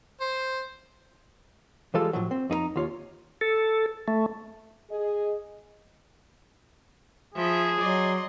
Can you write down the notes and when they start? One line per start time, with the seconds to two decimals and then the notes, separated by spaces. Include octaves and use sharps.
0.20 C5
1.94 E3 G3 G#3 F4 A4 A5
2.13 A2 F3 F#3
2.31 C4
2.50 F2 D#4 A4 A#5
2.76 D#2 F4 C#5
3.41 A4
4.08 A3
4.91 G#4 D#5
7.34 F3 G#4 E5 B5
7.79 F#3 D5 D#5 C6